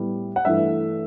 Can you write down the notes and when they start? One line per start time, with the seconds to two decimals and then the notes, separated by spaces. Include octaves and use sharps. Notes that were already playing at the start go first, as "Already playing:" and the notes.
Already playing: A2 G3 B3
0.36 F#5
0.45 G2 E3 A3 E5